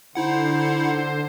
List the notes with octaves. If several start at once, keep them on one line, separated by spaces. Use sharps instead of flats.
D3 D#4 E4 C5 F#5